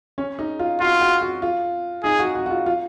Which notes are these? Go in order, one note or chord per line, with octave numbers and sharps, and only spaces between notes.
C#4
D#4
F4
F4 F#4
F#4
F#4
F4
D#4 G#4
F#4
F#4
F#4
F4
F4